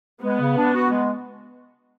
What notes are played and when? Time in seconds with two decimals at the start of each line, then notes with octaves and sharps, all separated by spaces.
0.22 G#3 B3
0.39 C#3
0.57 D4
0.73 F#4
0.90 G#3